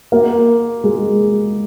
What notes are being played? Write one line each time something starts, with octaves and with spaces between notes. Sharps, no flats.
A#3
G#3